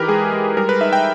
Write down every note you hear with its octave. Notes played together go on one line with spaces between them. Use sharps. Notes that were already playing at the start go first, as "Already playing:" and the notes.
Already playing: E3 D#4 G4 A#4 B4
G#3 G#4
G#3
G3 A#4
B4
D#4 E5
G5